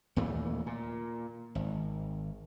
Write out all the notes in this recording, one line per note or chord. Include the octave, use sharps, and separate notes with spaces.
D#2 A#2 E3 A3
A#2
G#1